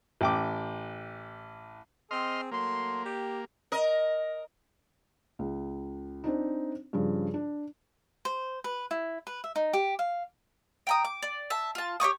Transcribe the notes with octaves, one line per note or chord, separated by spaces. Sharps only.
A1 G5 D6
C4 G#4 D#5 C6 F6
F#3 A3 A#3 C6
G4
A#4 D#5
C#2
C4 D4 D#4
G2 C#3 F3
D4
C5
B4
E4
B4
E5
D#4
G4
F5
G5 A#5 D#6
D6
D5
E5 A5
F4 A5
G4 C#5 C#6 D#6